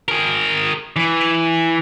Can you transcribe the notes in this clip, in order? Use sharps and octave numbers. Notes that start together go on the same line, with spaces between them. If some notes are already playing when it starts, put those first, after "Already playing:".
G#4 A#4
E3